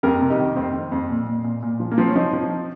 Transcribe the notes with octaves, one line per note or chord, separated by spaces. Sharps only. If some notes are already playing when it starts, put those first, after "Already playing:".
F2 G4 A#4
C3
D#4 G4
D#3
F2 C4 D#4
F2
F2
A#2
A#2
A#2
A#2
F3
A#3
F3 C4
C#4
F3 C4 D#4
F3